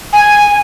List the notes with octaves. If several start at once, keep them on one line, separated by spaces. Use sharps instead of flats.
G#5